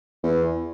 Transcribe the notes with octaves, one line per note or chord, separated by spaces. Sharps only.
E2